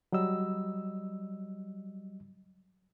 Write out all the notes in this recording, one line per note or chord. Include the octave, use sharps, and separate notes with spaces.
F#3 G3 D#5 E6